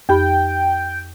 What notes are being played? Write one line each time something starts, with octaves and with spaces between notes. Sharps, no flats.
F2 G4 G5 B5